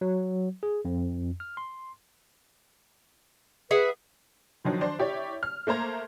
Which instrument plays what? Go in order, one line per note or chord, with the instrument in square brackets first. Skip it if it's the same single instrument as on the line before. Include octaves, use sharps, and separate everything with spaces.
[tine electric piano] F#3
G#4
F2
F6
C6
[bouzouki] G#4 E5 F#5 [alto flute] B4
[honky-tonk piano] D3 D#3 F3 F#3
D4 C5 D5
E4 G4 C#5 D5
F6
A3 A#3 C5 A#5 G#6